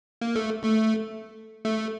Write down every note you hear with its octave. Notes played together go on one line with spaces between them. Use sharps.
A#3
A3
A3
A3